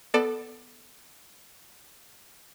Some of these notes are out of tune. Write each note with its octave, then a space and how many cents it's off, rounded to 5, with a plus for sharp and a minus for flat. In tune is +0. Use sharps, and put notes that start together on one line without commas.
B3 +5 A4 +0 D5 +25